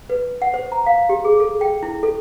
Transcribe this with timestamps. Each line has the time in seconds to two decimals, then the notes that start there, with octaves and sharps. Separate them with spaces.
0.10 B4
0.42 F#5
0.54 C5
0.72 A#5
0.86 F5
1.09 G4
1.24 G#4
1.40 A4
1.61 G5
1.83 E4
2.03 A4